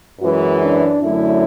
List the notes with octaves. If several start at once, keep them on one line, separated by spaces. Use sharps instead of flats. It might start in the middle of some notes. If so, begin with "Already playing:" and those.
F#2 E3 G#3 F#4
D4
F#2 D3 F#3 A3 E4